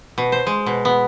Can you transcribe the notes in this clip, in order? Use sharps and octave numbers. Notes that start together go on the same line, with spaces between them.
B2
C5
G#3
B2
B3